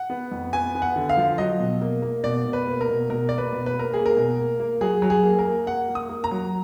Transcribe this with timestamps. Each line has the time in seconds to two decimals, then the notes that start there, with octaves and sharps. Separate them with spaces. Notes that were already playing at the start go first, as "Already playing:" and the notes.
Already playing: F#5
0.10 B3
0.31 F2
0.53 B3 G#5
0.75 B3
0.82 F#5
0.96 D3
1.09 F5
1.17 F3
1.38 F#3 D#5
1.59 B2
1.81 A#3
2.02 A#3
2.24 B2 D5
2.45 B2
2.53 B4
2.67 A#3
2.81 A#4
2.89 B2
3.10 B2 A#4
3.29 A#3 D5
3.38 B4
3.52 B2
3.66 B4
3.74 A#3
3.79 A#4
3.94 A#3 G#4
4.06 A#4
4.17 B2
4.39 A#3
4.60 A#3
4.81 F#3 G#4
5.02 F#3
5.10 G#4
5.23 A#3
5.39 A#4
5.45 A#3
5.66 A#3 F#5
5.89 A#3
5.95 D#6
6.09 A#3
6.24 A#5
6.31 F#3